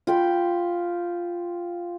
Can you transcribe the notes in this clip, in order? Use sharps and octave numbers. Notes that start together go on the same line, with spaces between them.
F4 G5 B5